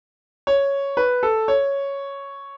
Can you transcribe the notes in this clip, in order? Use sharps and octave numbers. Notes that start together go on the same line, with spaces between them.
C#5
B4
A4
C#5